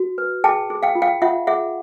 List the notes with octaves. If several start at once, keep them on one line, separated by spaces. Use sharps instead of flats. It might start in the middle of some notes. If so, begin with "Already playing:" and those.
Already playing: F#4
B4
G#4 G5 A5
G#4
F5 G5
F4
F5 G5
F4 E5 F#5
G#4 E5 F#5